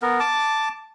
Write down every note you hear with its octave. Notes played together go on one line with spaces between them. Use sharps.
B3 A#4
A5 D6